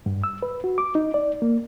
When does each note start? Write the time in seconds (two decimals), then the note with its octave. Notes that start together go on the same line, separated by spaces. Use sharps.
0.06 G2
0.24 E6
0.43 B4
0.64 F#4
0.78 D6
0.95 D#4
1.14 D5
1.42 A#3